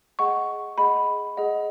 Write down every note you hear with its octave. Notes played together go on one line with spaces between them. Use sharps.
G#4 D#5 F#5 C#6
G#4 D#5 F#5 B5
G#4 D#5 F#5